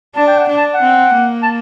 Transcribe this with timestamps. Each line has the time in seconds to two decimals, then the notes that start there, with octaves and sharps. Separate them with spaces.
0.15 D4 A5
0.27 G5
0.37 F#5
0.49 D4
0.57 A5
0.74 F#5
0.82 C4
1.15 A#3
1.42 A5